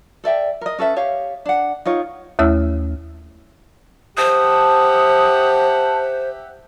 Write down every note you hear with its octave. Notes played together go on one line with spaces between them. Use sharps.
A4 D5 E5 G5
A#4 D#5
C#4 A4 B4 E5
G4 C#5 F5
D4 F#5
D#4 F4 C#5
D#2 A3 E4 C#5 E6 F6
G4 C5 E5 F#5 A5 D#6